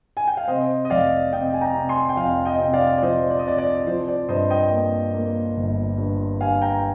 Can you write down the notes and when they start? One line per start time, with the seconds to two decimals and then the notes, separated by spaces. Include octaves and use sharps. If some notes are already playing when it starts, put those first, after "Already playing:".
0.17 G#5
0.27 G5
0.37 F5
0.48 C3 C5 D#5
0.85 D#5
0.90 F1 D5 F5
1.32 C3 D#5 G5
1.54 G#5
1.61 G5 A#5
1.74 C3
1.89 G#5 C6
2.09 G5
2.17 F2 F5 G#5
2.45 D#5 G5
2.59 C3
2.74 D5 F5
2.98 D5
3.02 F3 C5 D#5
3.31 D5
3.39 D#5
3.45 C3 D5
3.58 D5
3.87 F3 C5
4.08 D5
4.28 G2 C5 D#5
4.50 D#5 G5
4.71 A#3
5.14 A#3
5.57 G1
5.98 G2
6.40 G2 F5 G#5
6.62 G5 A#5